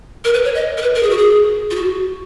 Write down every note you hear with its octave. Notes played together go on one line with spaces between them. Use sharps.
A#4
B4
C#5
D#5
A#4
B4
A#4
G#4
F#4
G#4
F4
F#4